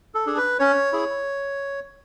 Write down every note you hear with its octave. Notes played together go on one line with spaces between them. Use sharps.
A4
D4 G#4
B4
C#4 C#5
E4 G#4